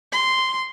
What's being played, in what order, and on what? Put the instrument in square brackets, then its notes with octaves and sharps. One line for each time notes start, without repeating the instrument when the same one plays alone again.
[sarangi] C6